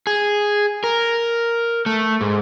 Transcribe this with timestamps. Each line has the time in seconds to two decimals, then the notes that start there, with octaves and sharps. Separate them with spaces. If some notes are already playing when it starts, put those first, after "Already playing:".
0.07 G#4
0.84 A#4
1.86 A3
2.21 G#2